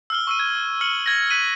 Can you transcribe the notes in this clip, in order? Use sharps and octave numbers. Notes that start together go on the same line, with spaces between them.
E6 F6 G7
C#6 E6 D#7
G#6
E6 F6 C#7 F#7
G#6 A#6
F6 F#6 B6 D#7 F#7